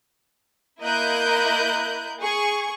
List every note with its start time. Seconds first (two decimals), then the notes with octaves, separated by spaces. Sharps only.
0.81 A#3 E4 A#4 D#5 F#6 G6
2.21 G#4 C#6